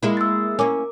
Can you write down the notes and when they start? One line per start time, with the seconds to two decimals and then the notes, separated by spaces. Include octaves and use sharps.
0.03 G#3 A#3 E4
0.17 E6 A6
0.59 A#3 C#4 A#4 D6